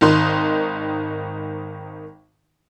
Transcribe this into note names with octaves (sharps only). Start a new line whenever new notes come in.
G#1 D#3 D#4 C6